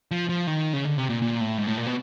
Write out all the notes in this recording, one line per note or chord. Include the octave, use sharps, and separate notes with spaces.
F3
F3
D#3
C#3
D3
C3
A#2
A#2
A2
G#2
A2
A#2
B2